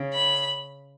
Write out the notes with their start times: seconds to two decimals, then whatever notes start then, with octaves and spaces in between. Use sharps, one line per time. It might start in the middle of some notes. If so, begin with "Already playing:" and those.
Already playing: C#3
0.13 B5